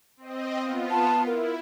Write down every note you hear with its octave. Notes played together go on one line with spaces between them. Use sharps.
C4 D#5
B3 F4
A5
E4 A#4